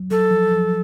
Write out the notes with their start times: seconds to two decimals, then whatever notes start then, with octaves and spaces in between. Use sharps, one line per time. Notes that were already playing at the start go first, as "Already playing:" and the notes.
Already playing: F#3
0.11 F#3 A4
0.31 F3
0.51 F3